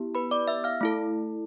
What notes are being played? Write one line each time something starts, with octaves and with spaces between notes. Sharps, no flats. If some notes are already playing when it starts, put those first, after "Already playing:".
Already playing: B3 E4 G4
B4 B5
D5 D6
E5 E6
F5 F6
A3 E4 A4